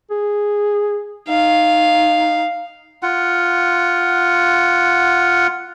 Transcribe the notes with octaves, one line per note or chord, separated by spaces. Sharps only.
G#4
D#4 F5
F4 F#5